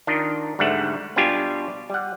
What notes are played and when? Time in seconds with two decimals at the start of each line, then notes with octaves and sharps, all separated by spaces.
0.07 D#3 D4 F4 A#4 D#5
0.59 D2 G#2 G3 A3 F#5
1.16 B2 G3 D4 F4 G4 G#5
1.90 G3 F#5